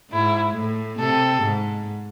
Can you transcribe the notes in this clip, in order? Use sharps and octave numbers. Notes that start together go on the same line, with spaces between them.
G#2 E4
A2
C3 A4
G#2